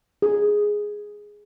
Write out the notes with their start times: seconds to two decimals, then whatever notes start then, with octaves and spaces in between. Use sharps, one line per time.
0.22 G#4